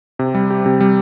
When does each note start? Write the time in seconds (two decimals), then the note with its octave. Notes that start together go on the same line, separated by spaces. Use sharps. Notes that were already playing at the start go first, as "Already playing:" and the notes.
0.19 C3
0.35 G3
0.50 G4
0.66 C3
0.81 G3